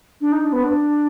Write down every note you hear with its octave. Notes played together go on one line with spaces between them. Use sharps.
D4
D#4
D4
B3
D4